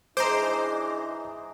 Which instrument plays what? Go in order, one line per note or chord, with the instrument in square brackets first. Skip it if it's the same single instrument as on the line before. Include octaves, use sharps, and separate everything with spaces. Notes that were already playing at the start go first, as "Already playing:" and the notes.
[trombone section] E3 D4 D#4 [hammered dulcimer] G#3 G#4 [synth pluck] C5 [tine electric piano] A#5 D6